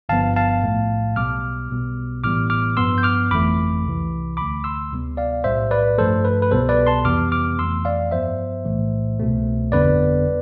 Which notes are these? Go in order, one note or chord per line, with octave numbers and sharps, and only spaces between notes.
G1 G2 F3 B3 F5 A5
F5 A5
B1 A2 F3 A3
B1 B2 G3 B3 D6 F6
B1 B2 G3 B3
A1 A2 E3 G3 B3 D6 F6
D6 F6
G2 F3 B3 C6 E6
G6
D6 F6
G1 F2 E3 A3 B5 D6
C2 C3 E3
D2 D3 A3 B5 D6
C6 E6
D2 C3 G3 B3
D5 F5
B1 A2 G3 C5 E5
B4 D5
G2 F3 A3 A4 C5
B4
B4
C2 B2 G3 B3 A4 C5
B4 D5
A5 C6
F2 C3 E3 G3 B3 D6 F6
D6 F6
F2 E3 A3 C6 E6
D5 F5
G2 F3 B3 C5 E5
B1 A2 E3 A3
C2 B2 A3
G1 F2 D3 G3 B3 B4 D5